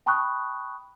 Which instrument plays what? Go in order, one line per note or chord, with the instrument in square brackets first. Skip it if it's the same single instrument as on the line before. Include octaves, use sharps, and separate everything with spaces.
[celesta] G5 A5 B5 C#6 D#6 F#6